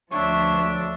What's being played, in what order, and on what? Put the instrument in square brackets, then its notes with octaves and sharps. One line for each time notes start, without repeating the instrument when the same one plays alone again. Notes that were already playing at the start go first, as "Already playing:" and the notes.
[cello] D2 F3 [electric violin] D4 [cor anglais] C#5 [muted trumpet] E5